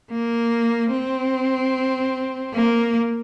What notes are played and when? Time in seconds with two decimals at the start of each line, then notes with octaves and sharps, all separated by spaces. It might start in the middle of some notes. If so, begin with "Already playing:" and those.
0.11 A#3
0.92 C4
2.54 A#3